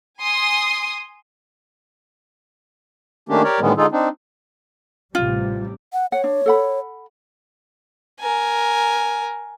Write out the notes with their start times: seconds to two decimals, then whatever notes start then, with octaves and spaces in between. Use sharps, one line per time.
0.19 G#5 C6 D#6
3.29 D#3 A3 A#3 C#4 D4 G4
3.44 G4 A#4 C#5 D5
3.60 A2 D3 D#3 G3 G#3 B3
3.77 D3 G#3 D#4 F4 G#4 A4
3.92 C4 D4 D#4
5.15 A1 C3 G3 F4
5.93 F#5
6.12 C#5 F#5
6.24 D4
6.46 A4 F#5 B5
8.20 A#4 G#5